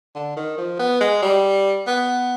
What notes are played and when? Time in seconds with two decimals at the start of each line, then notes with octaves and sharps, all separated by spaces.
0.15 D3
0.37 D#3
0.58 F3
0.79 B3
1.01 G#3
1.22 G3
1.87 B3